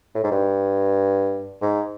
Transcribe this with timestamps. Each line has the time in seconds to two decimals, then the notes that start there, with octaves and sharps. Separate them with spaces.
0.15 A2
0.24 G#2
0.31 G2
1.62 G#2